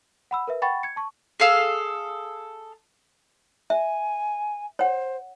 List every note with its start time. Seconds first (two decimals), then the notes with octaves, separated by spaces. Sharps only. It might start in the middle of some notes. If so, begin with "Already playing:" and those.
0.31 F#5 B5 E6
0.48 A#4 B4 E5
0.62 F#5 G5 B5 C#6 A6
0.83 G#6 C#7
0.96 A5 C#6
1.40 G#4 A4 F5 E6
3.70 E5 G#5
4.79 C5 C#5 F#5